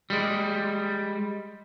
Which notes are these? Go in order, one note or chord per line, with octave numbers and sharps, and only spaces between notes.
G3 G#3